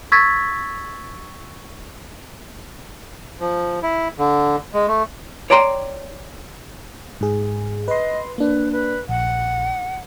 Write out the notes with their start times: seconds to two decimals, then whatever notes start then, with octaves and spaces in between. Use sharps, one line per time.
0.12 C#6 E6 G#6 A6 B6
3.40 F3
3.83 E4
4.19 D3
4.74 G#3
4.88 A3
5.50 C#5 D5 G5 A#5 C6
7.21 G#2 G#4
7.88 B4 D#5 C6
8.38 A#3 D4 B4
8.72 B4
9.09 A#1 F#5